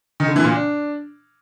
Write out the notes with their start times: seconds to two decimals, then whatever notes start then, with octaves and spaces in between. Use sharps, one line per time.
0.20 D#3
0.28 D3
0.36 E3
0.44 A#2
0.52 D4